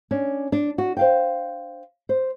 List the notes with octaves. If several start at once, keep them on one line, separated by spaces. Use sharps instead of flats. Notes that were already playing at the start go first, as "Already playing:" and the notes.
C#4 D4
D4
F#4
C5 F5 G5
C5